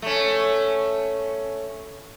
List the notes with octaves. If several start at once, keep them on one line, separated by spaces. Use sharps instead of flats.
A3 C#4